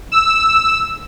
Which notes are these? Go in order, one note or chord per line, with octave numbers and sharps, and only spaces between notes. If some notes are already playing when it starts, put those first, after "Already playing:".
E6